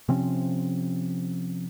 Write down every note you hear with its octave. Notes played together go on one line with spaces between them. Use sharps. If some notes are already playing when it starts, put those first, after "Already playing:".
C3 F3 C4 C#4